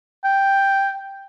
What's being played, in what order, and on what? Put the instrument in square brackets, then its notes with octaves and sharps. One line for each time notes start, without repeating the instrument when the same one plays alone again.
[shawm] G5